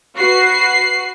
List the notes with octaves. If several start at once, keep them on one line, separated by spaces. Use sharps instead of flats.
F#4 B4 C7